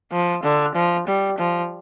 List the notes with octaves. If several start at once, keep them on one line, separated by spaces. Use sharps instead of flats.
F3
D3
F3
G3
F3